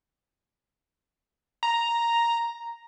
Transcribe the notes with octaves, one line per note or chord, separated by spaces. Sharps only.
A#5